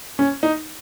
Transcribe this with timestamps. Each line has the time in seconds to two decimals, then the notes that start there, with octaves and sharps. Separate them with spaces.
0.19 C#4
0.43 D#4